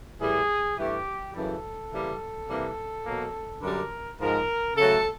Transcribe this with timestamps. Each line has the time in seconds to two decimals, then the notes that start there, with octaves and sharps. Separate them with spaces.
0.20 A2 E3 G3 G#4
0.77 G2 E3 A3 G4
1.34 F#2 C#3 E3 G3 A4
1.92 C#3 E3 G3 A#3
2.48 C3 E3 G3 A#3
3.06 B2 F#3 A#3
3.62 F#2 D3 G3 A#4
4.19 G#2 F3 G#3 A#4
4.76 C#3 F#3 A3 A4